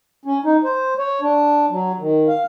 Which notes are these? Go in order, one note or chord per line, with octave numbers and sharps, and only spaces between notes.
C#4
D#4
C5
C#5
D4
F#3
D#3
F5